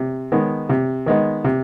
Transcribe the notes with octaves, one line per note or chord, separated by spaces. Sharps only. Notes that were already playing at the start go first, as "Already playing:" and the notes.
Already playing: C3
D#3 G#3 B3 D#4
C3
D#3 G#3 B3 D#4
C3